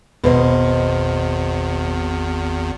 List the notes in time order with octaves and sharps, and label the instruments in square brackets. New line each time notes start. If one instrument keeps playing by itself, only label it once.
[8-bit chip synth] G#1 E2 [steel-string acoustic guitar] B2 C5 D#5